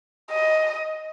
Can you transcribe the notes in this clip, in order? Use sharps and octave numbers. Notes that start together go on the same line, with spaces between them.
D#5